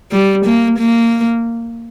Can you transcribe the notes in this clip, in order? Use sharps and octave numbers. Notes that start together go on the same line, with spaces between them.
G3
A#3
A#3